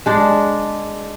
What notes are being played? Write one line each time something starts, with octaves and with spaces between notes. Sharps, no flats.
G#3 D4